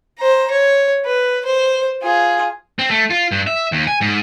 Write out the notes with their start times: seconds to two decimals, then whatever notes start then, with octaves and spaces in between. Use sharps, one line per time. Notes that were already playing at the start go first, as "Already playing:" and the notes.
0.18 C5 A#5
0.51 C#5
1.05 B4
1.45 C5
2.03 F4 G#4
2.79 C4
2.91 A3
3.10 F4
3.32 G2
3.47 E5
3.72 D#2
3.87 G#5
4.01 G#2